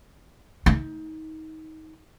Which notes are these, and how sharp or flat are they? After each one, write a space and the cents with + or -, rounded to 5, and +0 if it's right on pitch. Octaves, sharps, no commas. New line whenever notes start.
D#4 +25